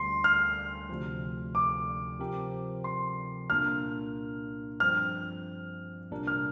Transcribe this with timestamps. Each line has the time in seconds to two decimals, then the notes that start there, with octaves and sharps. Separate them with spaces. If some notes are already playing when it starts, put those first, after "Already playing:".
Already playing: D2 D3 G3 C6
0.24 F6
0.89 D2 C3 F3
1.55 D6
2.20 C3 F3 C4 G4 A#4
2.84 C6
3.50 C2 A#2 A#3 D4 A#4 F6
4.80 G2 F3 C4 F6
6.11 C2 A#2 G3 D4 A#4
6.27 F6